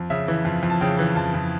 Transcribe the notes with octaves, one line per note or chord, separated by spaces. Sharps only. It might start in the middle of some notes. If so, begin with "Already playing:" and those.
Already playing: F2
C#3 E5
E3
F2
F2
A5
C#3 G5
E3
F2 A5
F2